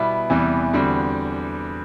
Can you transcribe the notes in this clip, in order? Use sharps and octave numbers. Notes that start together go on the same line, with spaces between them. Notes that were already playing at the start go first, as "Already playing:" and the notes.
Already playing: B2 G3 B3 E4
E2 C3 E3 G3 B3
E2 D3 G3 C4 F#4